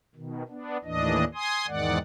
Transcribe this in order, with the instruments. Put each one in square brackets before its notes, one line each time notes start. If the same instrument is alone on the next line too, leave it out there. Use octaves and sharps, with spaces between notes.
[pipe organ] B2 D#3
B3 D4
D#2 A2 E3 D4 D#5
G#5 C6 D#6
E2 G#2 D#3 G#3 D5 F#5